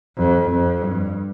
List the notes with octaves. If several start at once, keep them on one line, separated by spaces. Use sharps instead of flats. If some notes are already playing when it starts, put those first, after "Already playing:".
F2
F2
G2